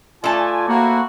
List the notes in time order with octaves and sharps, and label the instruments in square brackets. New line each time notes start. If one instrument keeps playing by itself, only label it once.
[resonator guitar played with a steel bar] A3 A5 [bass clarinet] F4 [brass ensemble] D5 G#5
[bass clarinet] A#3 [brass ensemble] C4 E4 F#4